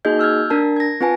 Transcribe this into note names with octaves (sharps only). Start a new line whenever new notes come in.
A#3 D#4 F#4 G#4 D#5 G6
E6 F6 G6 G#6
D4 A#4 A5
G#6 A#6
C4 F4 B4 G#5 A5